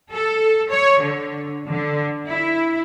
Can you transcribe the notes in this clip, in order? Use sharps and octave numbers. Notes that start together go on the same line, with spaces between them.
A4
C#5
D3
D3
E4